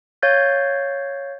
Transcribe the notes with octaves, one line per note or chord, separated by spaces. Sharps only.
C#5 F5 G6 A6